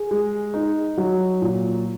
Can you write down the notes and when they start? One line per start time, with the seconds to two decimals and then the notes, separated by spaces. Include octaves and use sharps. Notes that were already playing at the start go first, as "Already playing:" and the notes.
Already playing: G#4
0.11 G#3
0.54 D#4
0.98 F#3
1.42 A#2